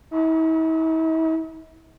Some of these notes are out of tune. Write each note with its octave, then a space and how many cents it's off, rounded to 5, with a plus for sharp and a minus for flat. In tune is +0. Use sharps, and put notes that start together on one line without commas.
E4 -45